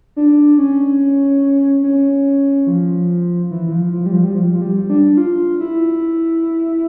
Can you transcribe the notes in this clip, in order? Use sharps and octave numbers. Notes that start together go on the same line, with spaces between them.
D4
C#4
C#4
F3
E3
E3
F3
F3
G3
F3
G3
F3
F3
G3
D4
F4
E4